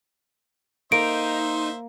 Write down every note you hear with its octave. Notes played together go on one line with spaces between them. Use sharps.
A#3 D#4 C5 E5 D7